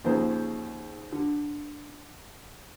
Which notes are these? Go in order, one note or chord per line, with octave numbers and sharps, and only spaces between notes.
D#2 C#3 F3 G#4 C5 A#5
D3